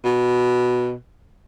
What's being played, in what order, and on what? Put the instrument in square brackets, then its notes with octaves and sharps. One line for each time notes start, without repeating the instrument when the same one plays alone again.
[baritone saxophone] B2